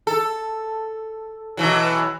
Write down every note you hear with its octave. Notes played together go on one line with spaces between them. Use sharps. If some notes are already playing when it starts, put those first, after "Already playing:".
A4
B2 E3 F#3